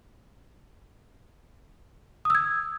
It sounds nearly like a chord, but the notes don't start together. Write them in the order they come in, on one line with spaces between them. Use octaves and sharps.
D#6 E6 G#6